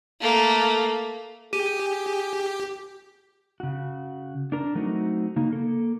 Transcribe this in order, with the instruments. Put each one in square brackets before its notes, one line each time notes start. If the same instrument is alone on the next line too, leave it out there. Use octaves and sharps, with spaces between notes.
[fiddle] A3 A#3
[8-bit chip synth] G4 [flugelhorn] G#4 [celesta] D#7
[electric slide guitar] C#3 F#4
D4 A#4
F#3 A3 C4 D#4 F4 F#4
C#3 A#3 D#4
A#3 A4